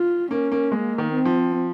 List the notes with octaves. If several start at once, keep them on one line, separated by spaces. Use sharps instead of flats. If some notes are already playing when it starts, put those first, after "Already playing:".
Already playing: F4
A#3 C#4
A#3
G#3 A#3
D#3
C4
F3